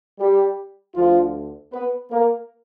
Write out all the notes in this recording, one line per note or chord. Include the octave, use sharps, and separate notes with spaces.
G3 G4
D2 D3 F3 F4
B3 B4
A#3 A#4